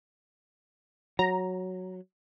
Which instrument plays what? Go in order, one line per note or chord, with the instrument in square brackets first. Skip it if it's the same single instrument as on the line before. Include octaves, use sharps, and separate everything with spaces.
[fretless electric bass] F#3 [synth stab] A#5